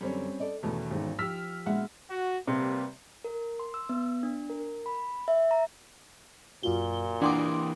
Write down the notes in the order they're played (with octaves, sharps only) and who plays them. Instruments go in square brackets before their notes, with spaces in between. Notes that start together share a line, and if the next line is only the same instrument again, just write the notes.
[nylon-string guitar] F#2 D3 [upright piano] G3 C4 C#4
[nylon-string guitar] A4 D5 D#5
[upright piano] E2 B2 [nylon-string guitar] D#3 A3 C#4
[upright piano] G#1 E2 G#2
[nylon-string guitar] F3 G4 [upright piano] E6 F6 B6
[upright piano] A#1 E5 F#5 [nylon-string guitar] G#3 B3 F#4
[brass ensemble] F#4
[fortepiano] C3 [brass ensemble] G3 A#3 B4
[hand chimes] A#4
C6
E6
B3
D4
A#4
B5
E5
A#5
[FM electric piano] F#2 F4 F#4 [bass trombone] A#2 [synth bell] G7
[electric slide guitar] E3 A#3 [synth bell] D4 C6 D6 [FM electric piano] F#5 G5 D#6